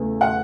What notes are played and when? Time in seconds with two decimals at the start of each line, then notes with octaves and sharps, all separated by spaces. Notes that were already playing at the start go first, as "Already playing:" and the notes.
Already playing: E2 C#3 E3 A3
0.21 F#5